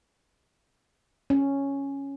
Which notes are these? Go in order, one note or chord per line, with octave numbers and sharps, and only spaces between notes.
C#4